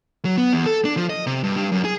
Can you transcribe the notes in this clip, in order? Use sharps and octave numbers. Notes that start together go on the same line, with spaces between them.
F#3
B3
E2
A4
D4
F3
D#5
C3
G2
G2
F#2
G#4